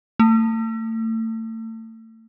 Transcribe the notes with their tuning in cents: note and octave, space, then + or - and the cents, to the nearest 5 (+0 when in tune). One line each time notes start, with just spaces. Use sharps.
A3 +35